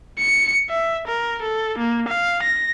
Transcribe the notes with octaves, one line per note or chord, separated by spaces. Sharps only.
C#7
E5
A#4
A4
A#3
F5
A#6